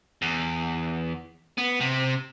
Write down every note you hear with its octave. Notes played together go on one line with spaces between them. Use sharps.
E2
B3
C3